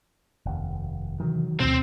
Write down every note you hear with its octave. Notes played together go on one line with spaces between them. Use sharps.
F1 D#2
C3 D#3 E3 F#3
D2 B2 C4